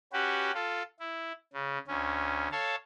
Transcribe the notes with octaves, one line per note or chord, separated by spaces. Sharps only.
C#4 F#4 G4 B4
F4 A4
E4
C#3
D2 C#4
A4 C#5 F5 A5